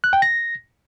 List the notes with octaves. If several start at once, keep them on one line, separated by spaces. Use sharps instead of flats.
F#6
G5
A#6